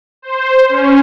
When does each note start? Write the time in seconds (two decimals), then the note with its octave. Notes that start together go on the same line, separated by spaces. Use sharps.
0.22 C5
0.69 C#4